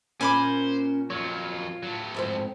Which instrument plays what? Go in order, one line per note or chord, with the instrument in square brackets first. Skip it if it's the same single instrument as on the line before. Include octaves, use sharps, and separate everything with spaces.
[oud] A#2 [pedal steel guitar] C#4 A#4 [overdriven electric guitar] C5 [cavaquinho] G#5 B5 D6
[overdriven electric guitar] F2 F#3 [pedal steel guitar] F4 C#5
[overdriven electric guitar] A2 F#3
[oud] F2 G#2 C4